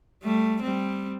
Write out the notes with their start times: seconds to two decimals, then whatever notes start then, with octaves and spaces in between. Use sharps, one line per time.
0.23 G3 A3
0.62 G3 C4